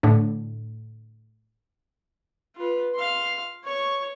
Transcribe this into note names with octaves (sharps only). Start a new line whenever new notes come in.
A2 D3
F4 B4
F5 C6
C#5 C#6